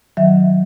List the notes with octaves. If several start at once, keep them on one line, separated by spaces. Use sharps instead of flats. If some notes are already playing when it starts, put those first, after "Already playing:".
D#3 F#3 E5